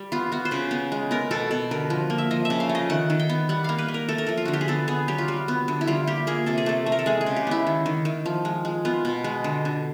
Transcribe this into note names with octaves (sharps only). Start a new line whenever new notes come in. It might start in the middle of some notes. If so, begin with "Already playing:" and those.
Already playing: G3
B3 F4
B3 F#4
C5
C#3 B4
B3
G#3
B3 A#4
B2 A4
B2 A4
D3 A#4
F3
A#3
E5
F3 D#5
E5
C#3
F5
A3
D#5
D#3 F#5
D#3
G5
B3
G3 F#5
A#3 F5
B4
A#3
A#4
A3 A4
A#4
F3 A4
F4
D3 F#4
G4
G#4
B3 A4
B3 G#4
F#3 G4
F4
G3 F#4
B3
D3
E4
G3 F4
A#3 G4
A#3 G#4
C3 A4
G#4
A3 A4
A3
A#4
A4
G#3 G#4
G#4
C#3
G4
B3 E4
D#3
D#3
D#3
F3
G#3
G#3
B3 F4
B2
G#3
D3
D3